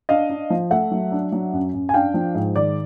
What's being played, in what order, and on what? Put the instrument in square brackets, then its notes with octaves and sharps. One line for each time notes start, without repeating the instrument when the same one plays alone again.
[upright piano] D4 D#5 F5
D4
F3
A3 E5 F#5
F#3
D4
F#3
F#2
F#2
G#5
D4 F5 G5
F3
G#2
D#3 D5